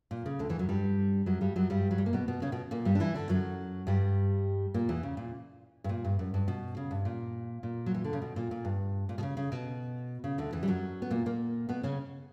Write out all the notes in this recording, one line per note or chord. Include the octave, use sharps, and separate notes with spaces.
A#2
C#3
D2 D3
E2 E3
F#2 F#3
G2 G3
F#2 F#3
G2 G3
F#2 F#3
G2 G3
F#3
G3
A#3
B2 B3
B2 B3
C#3 C#4
B2 B3
A#2 A#3
G2 G3
D4
E3 E4
D3 D4
F#2 F#3
G2 G3
A#2 A#3
E2 E3
C#3
A#2
G2
A#2
G2
F#2
G2
B2
C#3
G2
A#2
A#2
F#3
E3
D3
C#3
B2
A#2
A#2
G2
A#2
B2
C#3
C#3
B2
C#3
D2 D3
E2 E3
G3
F#2 F#3
B3
A#2 A#3
A#2 A#3
B2 B3
C#3 C#4